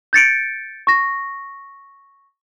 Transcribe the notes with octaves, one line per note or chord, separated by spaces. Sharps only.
G6 A6 C#7 D7
C#6 A#6